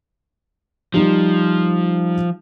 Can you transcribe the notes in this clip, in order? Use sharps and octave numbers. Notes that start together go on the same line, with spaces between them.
F3 G3 D#4 G4